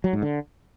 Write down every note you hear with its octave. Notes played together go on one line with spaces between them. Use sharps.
F#3
G#2
D3